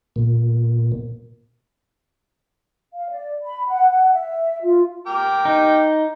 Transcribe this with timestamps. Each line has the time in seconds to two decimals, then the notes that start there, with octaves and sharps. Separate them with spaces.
0.16 A#2
2.93 F5
3.10 D5
3.43 B5
3.67 F#5
4.13 E5
4.64 F4
5.07 A#4 G5 D6
5.45 D#4